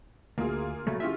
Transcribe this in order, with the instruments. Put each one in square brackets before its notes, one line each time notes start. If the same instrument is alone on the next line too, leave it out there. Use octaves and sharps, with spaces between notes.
[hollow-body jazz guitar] D2 [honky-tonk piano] A#3 F4 G#4
[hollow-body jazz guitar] C#3 F#3 A3
[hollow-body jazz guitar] C#4 E5 [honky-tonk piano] E4 F4 G4